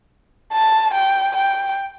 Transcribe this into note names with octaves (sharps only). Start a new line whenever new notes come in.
A5
G5
G5